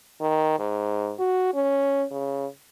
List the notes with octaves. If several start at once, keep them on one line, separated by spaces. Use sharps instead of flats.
D#3
G#2
F#4
C#4
C#3